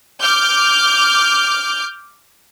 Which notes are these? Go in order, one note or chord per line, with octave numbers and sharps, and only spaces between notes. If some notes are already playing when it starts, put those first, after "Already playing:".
D6 F6 G6